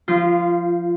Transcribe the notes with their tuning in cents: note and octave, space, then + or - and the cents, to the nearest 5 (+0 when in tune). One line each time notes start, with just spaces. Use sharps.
F3 +0 F4 -25